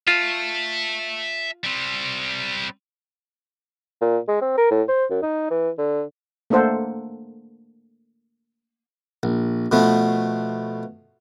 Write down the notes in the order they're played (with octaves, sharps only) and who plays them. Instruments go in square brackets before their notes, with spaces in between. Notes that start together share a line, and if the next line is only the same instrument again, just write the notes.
[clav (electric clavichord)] F4 [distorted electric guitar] E5 A5
[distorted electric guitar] G3 C4
[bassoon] A#2
G#3
C4
A#4
A2
C5
F#2
D#4
E3
D3
[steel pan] A3 A#3 D4 A4 C5 F#5
[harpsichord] A#1
B2 F3 A3 B3